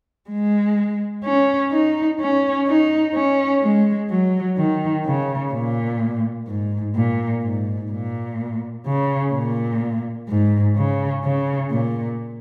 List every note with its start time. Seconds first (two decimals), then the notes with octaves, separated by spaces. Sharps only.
0.30 G#3
1.24 C#4
1.72 D#4
2.20 C#4
2.66 D#4
3.15 C#4
3.62 G#3
4.10 F#3
4.57 D#3
5.06 C#3
5.53 A#2
6.47 G#2
6.95 A#2
7.43 G#2
7.90 A#2
8.86 C#3
9.34 A#2
10.28 G#2
10.76 C#3
11.24 C#3
11.71 A#2